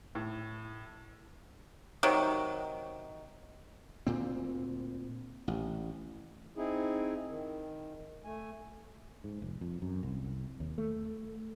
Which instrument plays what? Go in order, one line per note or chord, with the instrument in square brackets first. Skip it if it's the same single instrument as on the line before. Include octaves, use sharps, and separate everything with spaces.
[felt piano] A2
[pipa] C3 D#3 F#3
[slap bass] D2 A#2 C4
A1
[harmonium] C4 D#4 E4 G#4
D#3
A3 G#5
[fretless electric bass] G#2
F1
F2
F#2
C2
D#2
A3